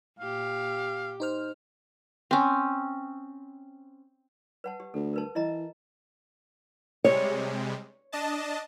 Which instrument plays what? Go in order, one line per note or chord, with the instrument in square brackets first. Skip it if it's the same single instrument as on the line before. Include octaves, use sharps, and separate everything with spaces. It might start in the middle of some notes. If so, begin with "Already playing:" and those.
[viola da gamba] A#2 G4 [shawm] F5
[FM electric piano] D#4 C5 F6
[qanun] C4 C#4
[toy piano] B4 F#5 A5
G4
[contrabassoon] D2 [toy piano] A4
[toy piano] A#4 B4 A5
[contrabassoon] E3 [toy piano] E4 D#5 A#5
[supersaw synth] C3 G3 G#3 [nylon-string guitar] C#5
[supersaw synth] D4 D#5 A5